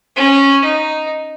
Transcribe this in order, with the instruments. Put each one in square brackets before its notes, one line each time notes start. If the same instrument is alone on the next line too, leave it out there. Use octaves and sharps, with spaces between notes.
[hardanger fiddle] C#4
D#4